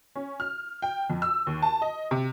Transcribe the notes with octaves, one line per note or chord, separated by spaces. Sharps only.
C#4
F6
G5
F2
E6
D#2
A5
D#5
C3